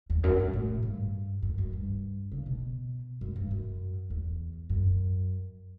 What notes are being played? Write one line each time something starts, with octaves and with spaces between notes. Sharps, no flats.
E2
F#2
G2
A2
G2
F#2
F#2
G2
C#3
B2
F#2
G2
F#2
E2
F#2